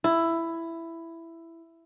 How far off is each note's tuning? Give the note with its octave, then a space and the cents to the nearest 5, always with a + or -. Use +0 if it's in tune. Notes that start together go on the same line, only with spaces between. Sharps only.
E4 +10